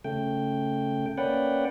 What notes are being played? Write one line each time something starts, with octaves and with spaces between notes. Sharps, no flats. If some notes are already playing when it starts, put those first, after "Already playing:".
C#3 A3 G5
A#3 C#4 B4 D5 F#5 G5